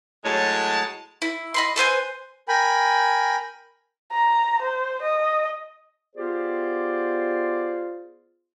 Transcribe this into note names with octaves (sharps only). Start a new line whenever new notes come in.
A2 F#3 G#3 C#5 A5
E4
D#5 B5 C6
A4 B4 C5 G#5
A#4 G5 G#5 B5
A#5
C5
D#5
B3 F4 G4 G#4 C5 D5